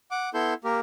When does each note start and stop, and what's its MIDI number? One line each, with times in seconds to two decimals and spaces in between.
0.11 0.30 78
0.11 0.30 86
0.34 0.54 59
0.34 0.54 64
0.34 0.54 69
0.34 0.54 84
0.34 0.54 91
0.64 0.80 58
0.64 0.80 67
0.64 0.80 70